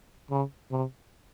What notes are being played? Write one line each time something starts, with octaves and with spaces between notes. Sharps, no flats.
C#3
C3